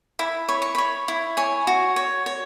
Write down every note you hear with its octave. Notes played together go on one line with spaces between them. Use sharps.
E4 B5
C#5 B5
C#6
C#5 B5
E4
C#5 G#5
F#4
C#5
C#5